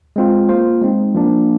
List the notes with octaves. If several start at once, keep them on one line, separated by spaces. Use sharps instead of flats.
G#3 C4 F4
A#3 F4 C5
G#3 C4 D#4
F3 A#3 D4